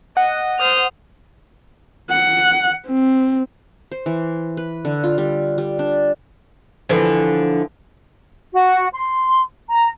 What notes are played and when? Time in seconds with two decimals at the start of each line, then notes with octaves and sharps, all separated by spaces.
0.17 D#5 F#5
0.58 C5 D#6 F6
2.10 F#5
2.87 C4
3.92 C5
4.06 E3
4.57 B4
4.85 D3
5.04 F4
5.18 G3
5.58 G3
5.79 D4
6.89 D3 E3 F3
8.53 F#4
8.93 C6
9.70 A#5